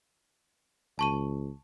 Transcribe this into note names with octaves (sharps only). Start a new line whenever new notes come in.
C#2 A5 C#6 D#7